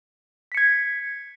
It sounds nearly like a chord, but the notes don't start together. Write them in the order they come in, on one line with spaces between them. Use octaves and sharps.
B6 C#7 G#6